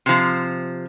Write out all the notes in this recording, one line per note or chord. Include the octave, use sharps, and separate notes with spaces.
C3 F3